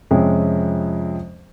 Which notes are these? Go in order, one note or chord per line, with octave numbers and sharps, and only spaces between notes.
F2 C3 F3 G#3 C#4